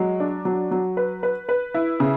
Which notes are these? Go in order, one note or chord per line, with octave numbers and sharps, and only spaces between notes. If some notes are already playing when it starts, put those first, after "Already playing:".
Already playing: F#3 G#3
D4
F#3
F#3
B4
B4
B4
E4
C#3